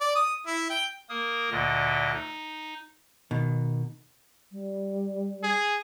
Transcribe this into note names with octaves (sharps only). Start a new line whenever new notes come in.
D5
D#6
E4
G5
A#3 A#4 D#6
D2 A#2 D3 D#5
D#4
B2 D#3
G3
G#4